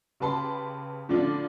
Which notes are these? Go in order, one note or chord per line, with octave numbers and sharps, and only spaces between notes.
C#3 G4 B4 A5 B5 C6
A2 D3 F3 D4 F4